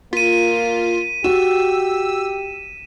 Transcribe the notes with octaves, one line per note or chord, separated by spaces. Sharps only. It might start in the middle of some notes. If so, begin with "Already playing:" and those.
A#3 F4 B6 D#7
F#4 G4 E6 E7